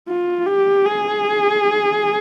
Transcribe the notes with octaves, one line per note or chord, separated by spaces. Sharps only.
F4
G4
G#4